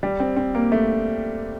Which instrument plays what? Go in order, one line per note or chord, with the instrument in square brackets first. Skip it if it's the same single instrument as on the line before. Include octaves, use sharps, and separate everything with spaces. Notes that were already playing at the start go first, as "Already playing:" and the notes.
[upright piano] G3
C4
C4
A#3
A3